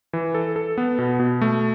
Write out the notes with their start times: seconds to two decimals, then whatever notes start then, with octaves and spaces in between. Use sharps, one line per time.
0.13 E3
0.34 A4
0.56 A4
0.78 B3
0.99 B2
1.20 B2
1.41 A3